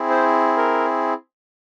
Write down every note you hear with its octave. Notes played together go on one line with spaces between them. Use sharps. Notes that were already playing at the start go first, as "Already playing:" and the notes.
Already playing: C4 E4 G#4
C5
A#4